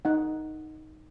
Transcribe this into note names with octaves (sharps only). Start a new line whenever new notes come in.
D#4 F#5